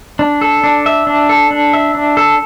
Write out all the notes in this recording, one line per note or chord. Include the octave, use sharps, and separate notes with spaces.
D4
A4
D4
E5
D4
A4
D4
E5
D4
A4